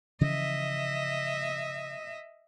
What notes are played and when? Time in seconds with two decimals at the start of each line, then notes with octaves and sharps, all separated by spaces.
0.21 C#3 E3 F3 D#5 E5